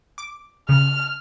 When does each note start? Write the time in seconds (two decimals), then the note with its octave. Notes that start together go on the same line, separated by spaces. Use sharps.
0.18 D6
0.69 C#3 F6